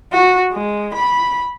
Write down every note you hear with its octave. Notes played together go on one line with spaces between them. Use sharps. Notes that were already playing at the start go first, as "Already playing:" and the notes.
F#4
G#3
B5